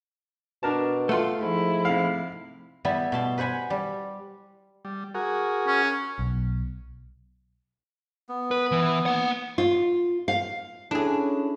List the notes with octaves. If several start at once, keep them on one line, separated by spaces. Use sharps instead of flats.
B2 D4 A#4 A5
A3 F4 F#5 C6
G#2 F3 E4
C3 F5
G3 B3 E4
B2 A5 C6
B4 C5 F#5 G#5 B5
G3
G3
F#4 G#4 A#4
C#4
B1
B3
B4
E3
A#3 F#5
F4
F5
C#4 D4 E4 G#4 A4